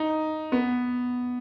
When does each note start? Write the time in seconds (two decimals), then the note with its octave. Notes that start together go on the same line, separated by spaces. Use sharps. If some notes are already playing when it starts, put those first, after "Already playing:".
Already playing: D#4
0.52 B3